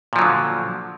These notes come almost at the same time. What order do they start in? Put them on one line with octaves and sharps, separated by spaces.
A#2 F3 F#3 D3